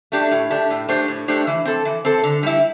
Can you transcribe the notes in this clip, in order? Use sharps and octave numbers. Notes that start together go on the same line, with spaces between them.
A3 D4 G4
A2
A3 D4 G4
A2
A3 D4 G4 C5
A2
A3 D4 G4 C5
E3
C4 A4
E3
C4 A4
D3
G3 E4